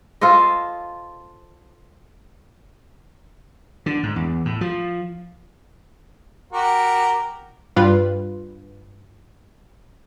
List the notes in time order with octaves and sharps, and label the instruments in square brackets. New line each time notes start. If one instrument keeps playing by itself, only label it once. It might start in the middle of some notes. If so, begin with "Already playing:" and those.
[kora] F4 A4 C5 D#5
[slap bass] D3
G#2
E2
A2
F3
[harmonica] F#4 G4 A#4
[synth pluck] G2 G3 F4 B4